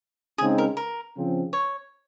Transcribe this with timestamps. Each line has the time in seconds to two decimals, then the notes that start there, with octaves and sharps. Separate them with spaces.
0.38 C#3 G#3 C4 D#4 G#4
0.58 A#4
0.77 A#4
1.15 C#3 F3 C4
1.53 C#5